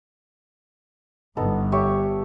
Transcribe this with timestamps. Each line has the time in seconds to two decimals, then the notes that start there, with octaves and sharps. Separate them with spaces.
1.37 G1 B3 D#4 A4
1.72 G4 C#5 E5